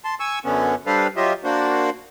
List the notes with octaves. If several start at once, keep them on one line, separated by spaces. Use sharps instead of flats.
A5 C6
G#5 C#6 E6
F#2 D3 B3 C#4
G3 D4 A4 B4 C5 F5
F#3 F4 G4 D#5 E5
A#3 D4 F#4 C5